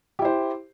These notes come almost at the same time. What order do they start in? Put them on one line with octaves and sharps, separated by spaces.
G4 E4 C5